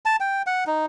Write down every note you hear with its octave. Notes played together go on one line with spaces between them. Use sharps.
A5
G5
F#5
D#4